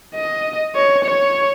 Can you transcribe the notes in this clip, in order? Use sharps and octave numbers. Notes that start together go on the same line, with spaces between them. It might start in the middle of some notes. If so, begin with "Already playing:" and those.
D#5
C#5
C#5